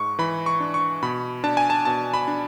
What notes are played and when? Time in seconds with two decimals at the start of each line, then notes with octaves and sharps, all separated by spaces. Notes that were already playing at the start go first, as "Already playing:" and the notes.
Already playing: G#2 G#3 C#6
0.19 E3 B5
0.46 C#6
0.60 D4
0.74 C#6
1.03 B2 B5
1.44 D4 A5
1.57 G#5
1.70 A5
1.85 B2 A5
2.14 B5
2.28 D4